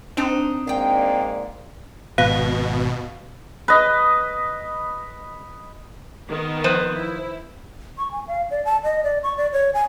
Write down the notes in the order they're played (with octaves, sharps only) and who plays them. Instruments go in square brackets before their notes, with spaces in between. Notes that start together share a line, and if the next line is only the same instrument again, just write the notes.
[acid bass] C4 [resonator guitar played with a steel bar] D4 D#4 A5
[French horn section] G#2 A#3 D5 [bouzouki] F5 G5
[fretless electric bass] G#1 [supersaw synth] B2 [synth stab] B4 [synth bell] F5
[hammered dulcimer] B4 D#5
[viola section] D#3 B3
[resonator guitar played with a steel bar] F3 B4 C5
[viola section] E4
[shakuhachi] C#6
G#5
F5
D5
A5
D#5
D5
C#6
D5
C#5
G#5